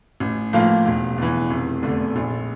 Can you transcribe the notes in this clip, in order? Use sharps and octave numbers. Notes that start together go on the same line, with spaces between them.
A1
A2 F3 A#3 F4
E1
E2 E3
F1
E2 D3 A3
A#1